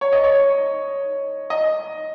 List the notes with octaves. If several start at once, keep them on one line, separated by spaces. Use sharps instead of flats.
C#5
D#5
C#5
D#5